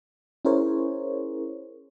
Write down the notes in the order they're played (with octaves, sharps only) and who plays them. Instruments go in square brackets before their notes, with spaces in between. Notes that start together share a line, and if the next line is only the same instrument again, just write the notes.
[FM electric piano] C#4 E4 G#4 A#4 C5 C#5